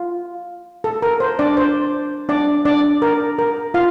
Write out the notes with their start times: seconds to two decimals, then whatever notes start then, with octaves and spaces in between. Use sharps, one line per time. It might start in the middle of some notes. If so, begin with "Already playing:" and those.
Already playing: F4
0.84 A4
1.02 A#4
1.20 C5
1.39 D4 D5
1.57 C5
2.29 D4 D5
2.65 D4 D5
3.02 A#4
3.39 A#4
3.74 F4 F5